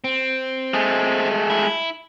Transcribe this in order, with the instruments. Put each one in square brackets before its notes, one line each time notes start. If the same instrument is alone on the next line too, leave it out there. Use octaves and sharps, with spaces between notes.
[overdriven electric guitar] C4
[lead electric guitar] G#3 A3
[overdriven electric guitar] E4